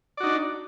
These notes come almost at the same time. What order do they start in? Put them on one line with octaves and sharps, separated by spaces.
D5 F#4 D#4 D4